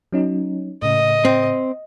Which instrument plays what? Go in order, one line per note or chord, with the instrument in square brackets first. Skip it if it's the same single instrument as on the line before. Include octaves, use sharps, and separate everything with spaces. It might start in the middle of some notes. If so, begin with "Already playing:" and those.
[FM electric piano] F#3 C#4 D#4
[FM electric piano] A2 C#3 [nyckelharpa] D#5
[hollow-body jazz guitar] C4